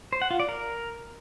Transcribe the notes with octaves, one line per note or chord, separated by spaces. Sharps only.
C5
F#5
F4
D5
A#4